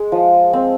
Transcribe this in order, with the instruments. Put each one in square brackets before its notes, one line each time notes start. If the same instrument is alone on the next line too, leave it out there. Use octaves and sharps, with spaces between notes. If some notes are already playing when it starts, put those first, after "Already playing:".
Already playing: [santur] G#3
F3
C4